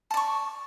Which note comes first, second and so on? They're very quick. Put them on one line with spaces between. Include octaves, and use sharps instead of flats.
A5 D5 C#6